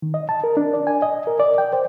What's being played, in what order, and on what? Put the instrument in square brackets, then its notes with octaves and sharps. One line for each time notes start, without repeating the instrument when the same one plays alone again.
[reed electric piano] D#3
D#5
A5
A#4
D4
D5
G#5
D#5
A#4
D5
G5
C5